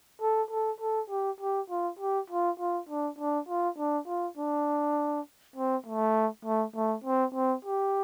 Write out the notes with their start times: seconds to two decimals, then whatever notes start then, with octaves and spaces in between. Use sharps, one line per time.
0.22 A4
0.51 A4
0.80 A4
1.10 G4
1.40 G4
1.70 F4
1.99 G4
2.30 F4
2.60 F4
2.89 D4
3.18 D4
3.49 F4
3.78 D4
4.07 F4
4.37 D4
5.56 C4
5.86 A3
6.45 A3
6.76 A3
7.04 C4
7.34 C4
7.65 G4